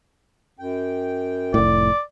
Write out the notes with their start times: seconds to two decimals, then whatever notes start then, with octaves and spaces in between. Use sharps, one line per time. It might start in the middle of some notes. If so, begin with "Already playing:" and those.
0.59 F#2 G5
1.54 F1 A2 D5